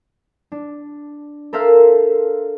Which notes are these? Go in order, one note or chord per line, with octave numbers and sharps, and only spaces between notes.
D4
A4 A#4 C5 E5 F5